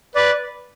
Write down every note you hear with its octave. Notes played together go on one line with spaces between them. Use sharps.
B4 D5